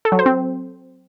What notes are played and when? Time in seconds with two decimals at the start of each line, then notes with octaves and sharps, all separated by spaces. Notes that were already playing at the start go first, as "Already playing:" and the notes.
0.05 A4
0.12 F#3
0.19 C5
0.26 C4